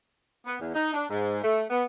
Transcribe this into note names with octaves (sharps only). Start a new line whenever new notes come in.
B3
E2
D#4
D4
G#2
A3
B3